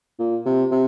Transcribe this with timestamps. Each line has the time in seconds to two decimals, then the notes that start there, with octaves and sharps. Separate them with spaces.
0.19 A#2
0.46 C3
0.71 C3